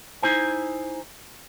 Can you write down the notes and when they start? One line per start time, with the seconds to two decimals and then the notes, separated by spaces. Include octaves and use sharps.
0.23 D#4 E4 C5 G#5